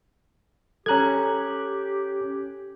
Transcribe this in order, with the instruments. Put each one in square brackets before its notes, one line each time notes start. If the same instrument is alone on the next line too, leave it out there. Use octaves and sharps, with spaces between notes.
[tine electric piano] C#4 F#6 G#6 [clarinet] G4 [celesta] A4 A#5